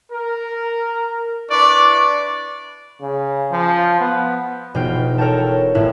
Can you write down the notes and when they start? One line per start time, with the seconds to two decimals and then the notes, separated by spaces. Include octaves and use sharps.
0.11 A#4
1.51 D4 E4 B4 D5 C#6 D6
3.02 C#3
3.52 F3
4.01 B3
4.74 E1 B2 D#4 F4 G5
5.18 A4 A#4 C#5 G5 A5
5.75 A1 A2 E4